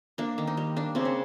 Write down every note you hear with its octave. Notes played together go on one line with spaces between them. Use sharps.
A#3 D4
D#3
D#4
G3
A#3 D4
C#3 C4
C#4